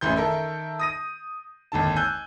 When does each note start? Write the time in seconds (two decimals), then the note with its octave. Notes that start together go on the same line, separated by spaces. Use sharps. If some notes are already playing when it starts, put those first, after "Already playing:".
0.01 A1 C#3 E3 C6 G6
0.16 D#3 A4 A#4 E5
0.79 D#6 A#6 D#7
1.72 G#1 D#2 D3 A5
1.96 G#5 E6 F#6 G6